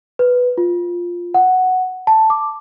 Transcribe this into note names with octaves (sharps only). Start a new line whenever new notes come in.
B4
F4
F#5
A5
D6